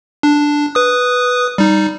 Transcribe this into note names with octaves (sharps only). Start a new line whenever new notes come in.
D4
B4 D#6
G3 D#4